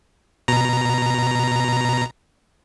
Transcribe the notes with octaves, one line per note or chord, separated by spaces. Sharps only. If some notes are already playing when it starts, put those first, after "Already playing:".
B2 A#5